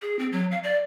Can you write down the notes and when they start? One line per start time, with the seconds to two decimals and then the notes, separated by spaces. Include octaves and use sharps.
0.02 G#4
0.19 C4
0.32 F#3
0.51 F5
0.63 D5